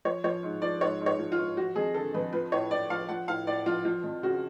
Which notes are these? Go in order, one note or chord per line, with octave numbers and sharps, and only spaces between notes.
F3 C#5
F3 C#5
G#2
F3 D5
G#2 C#5
G#2
C#5
F3
F4
G#2
F3 F#4
F2 G#4
D3 A4
F2 B4
F3 B4
A2 C#5
A2 D5
F3 F5
F3 F#5
A2 F5
A2 D5
F3 F4
F3 F4
F2
C#3 F#4